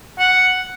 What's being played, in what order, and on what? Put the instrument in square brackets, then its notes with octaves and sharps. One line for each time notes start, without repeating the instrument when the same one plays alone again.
[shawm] F#5